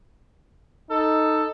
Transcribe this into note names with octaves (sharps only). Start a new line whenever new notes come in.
D#4 A4